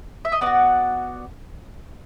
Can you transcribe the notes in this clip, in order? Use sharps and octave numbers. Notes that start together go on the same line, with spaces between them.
E5
D#5
B3 D#4 F#4 D5